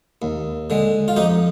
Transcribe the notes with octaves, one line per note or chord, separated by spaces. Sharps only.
D#2
D3 G#3
F4
F2 D#4 G4